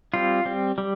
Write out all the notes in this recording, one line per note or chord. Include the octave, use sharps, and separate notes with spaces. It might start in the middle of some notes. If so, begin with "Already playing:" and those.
G3 C4 F4
G3 C4
G3